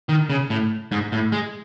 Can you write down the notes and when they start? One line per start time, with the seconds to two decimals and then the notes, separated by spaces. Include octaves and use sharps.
0.09 D#3
0.30 C#3
0.50 A2
0.92 G#2
1.12 A2
1.32 G#3